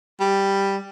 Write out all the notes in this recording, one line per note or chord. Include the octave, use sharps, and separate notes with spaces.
G3